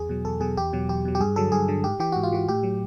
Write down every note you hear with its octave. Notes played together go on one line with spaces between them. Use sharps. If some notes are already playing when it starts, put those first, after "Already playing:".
Already playing: E2 G#4
B2 F#3
E2 A4
B2 F#3 G#4
E2 G4
B2 F#3
E2 G4
B2 F#3
G4
G2 G#4
D3 F#3 A4
G2 G#4
D3 F#3
G#2 G4
E3 G4
G#2 F#4
F4
E3 F#4
A2 G4
F#3